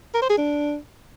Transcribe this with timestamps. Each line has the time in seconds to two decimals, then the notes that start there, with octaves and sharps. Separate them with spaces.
0.14 A#4
0.22 C5
0.30 G#4
0.37 D4